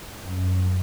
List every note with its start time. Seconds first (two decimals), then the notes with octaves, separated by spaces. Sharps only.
0.20 F#2